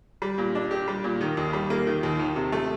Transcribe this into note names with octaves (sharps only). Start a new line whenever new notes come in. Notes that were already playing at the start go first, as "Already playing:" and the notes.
G3
A#2
D4
G4
G3
A#2
D#3
D#2
G3
A#3
D#3
D#2
D#3
C3
A3